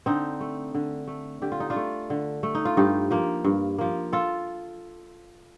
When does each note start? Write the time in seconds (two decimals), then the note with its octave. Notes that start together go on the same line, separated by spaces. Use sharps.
0.06 D3 C4 D#4
0.40 A3
0.75 D3
1.07 A3
1.42 D3 G4
1.52 F4
1.60 D#4
1.70 D4 F4
1.76 A3
2.10 D3
2.43 A3
2.55 D#4
2.65 F4
2.77 G2 D#4 G4
3.11 F3 A#3
3.44 G2
3.78 F3 A#3
4.13 F4 A4